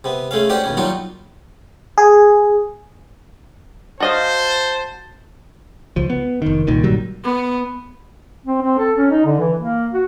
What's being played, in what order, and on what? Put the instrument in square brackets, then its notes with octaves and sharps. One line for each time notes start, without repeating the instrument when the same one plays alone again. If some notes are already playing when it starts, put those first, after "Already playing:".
[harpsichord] C3 B3
G#3 A3 C#4 F5
C#4 D4 F#4 G4 C5 D5
D#2 B2 C#4
F#3 G3 D#4 F4 F#4
[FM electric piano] G#4
[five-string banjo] F#4 D#5 F5 [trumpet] C5 [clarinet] A5
[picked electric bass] C#2 F3
B3
F1 D#3
C2 A#2 D#3
G1 A#2 F#3 G3
[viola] B3
[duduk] C4
C4
A4
C#4
D#4
D3
E3
A#3
F#4